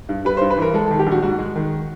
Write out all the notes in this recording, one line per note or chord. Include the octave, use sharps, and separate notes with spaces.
G2
G3 B4
G2 C5
B4
E3 A#4
G#3 A4
D#3 A4
G4
A#1 F#4
G#2 F#4
G#3
D#3